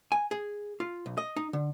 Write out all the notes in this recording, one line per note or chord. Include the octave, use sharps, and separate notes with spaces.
G#5
G#4
F4
B1
D#5
D#4
D3